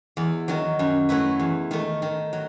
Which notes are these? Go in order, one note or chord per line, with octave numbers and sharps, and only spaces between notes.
E2
D#3 F#3
F#2
F#3 A3 E4 B4
E2
D#3 A3
D#3
F#3